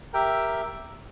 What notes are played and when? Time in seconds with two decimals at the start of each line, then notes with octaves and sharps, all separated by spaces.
0.13 G4 A#4 E5 G5